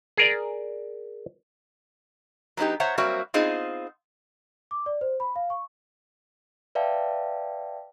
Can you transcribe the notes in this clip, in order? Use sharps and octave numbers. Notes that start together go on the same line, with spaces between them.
G#4 A#4 D5
F#3 B3 C#4 D#4 G4
C5 C#5 E5 F#5 A#5
F#3 G3 A#3 C4 F#4 E5
B3 C4 D#4 F4 G#4
D6
D5
C5
B5
F5
C#6
B4 D5 E5 F5 G5 A5